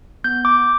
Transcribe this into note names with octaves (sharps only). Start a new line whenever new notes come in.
B3 G6
D6